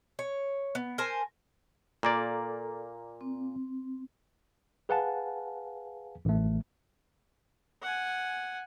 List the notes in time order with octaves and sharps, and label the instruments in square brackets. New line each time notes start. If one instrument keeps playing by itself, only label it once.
[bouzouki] C#5
B3
A#4 C5 G#5 A5
[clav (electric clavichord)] A#2 A#3 D5 [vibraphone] A4
[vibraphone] C4
[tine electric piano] G#4 B4 F5 F#5 G#5 A5
A1 A3
[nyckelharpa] F#5 G#5